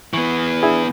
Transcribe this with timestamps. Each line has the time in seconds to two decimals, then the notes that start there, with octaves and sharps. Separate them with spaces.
0.13 E3 B3 C#6
0.63 D4 E4 G#4